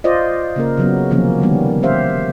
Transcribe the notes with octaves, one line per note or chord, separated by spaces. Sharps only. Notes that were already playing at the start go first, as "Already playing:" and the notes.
F4 C5 D5 D#5
C#3 A#3 A#4
C#3 F#3 B3
C3 D#3 F3 F#3 A#3 C#4
D3 D#3 G3 B3
C#4 G4 C5 E5 F5